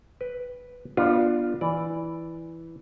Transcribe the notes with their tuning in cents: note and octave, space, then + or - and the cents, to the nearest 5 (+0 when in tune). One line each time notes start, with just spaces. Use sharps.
B4 +0 G5 +0
B3 -25 D4 +20 F4 +0
E3 +0 D5 +0